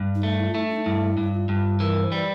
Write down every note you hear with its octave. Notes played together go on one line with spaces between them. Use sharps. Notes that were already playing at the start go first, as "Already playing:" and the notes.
Already playing: G2
D#4
A3
E4
F4
A3 E4
D#4
D4
D#4
G2 E4
G2
F4
G2
E3 A#4
C5
G3 B4